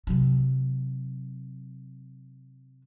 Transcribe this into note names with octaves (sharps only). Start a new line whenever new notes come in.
C3 F#3